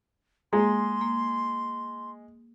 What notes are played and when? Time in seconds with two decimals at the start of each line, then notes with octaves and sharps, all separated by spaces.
0.53 G#3 A#3 G#4 C6
1.01 A#3